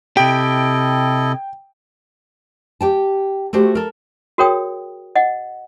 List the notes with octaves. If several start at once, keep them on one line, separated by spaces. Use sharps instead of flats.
C3 E4 G4 A4 D#5 G5
G4 G5 A5
A3 F#4 G4 C5
A4 A#4
F#4 G#4 A#4 C#5 G5 D#6
D#5 F#5